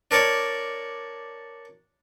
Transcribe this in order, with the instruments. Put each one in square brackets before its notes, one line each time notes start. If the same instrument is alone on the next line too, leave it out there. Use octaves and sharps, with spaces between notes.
[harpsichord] D4 A#4 C#5 D5